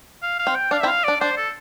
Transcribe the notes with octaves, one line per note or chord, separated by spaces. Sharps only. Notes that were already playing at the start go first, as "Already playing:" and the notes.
F5
F5
C4
G5
D4 F5
C4 E4 E5
F5
D4 D5
D4 C5
A4